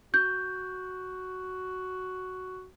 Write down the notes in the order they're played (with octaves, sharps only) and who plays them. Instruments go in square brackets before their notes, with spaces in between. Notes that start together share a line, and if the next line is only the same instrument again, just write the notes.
[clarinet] F#4 [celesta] G6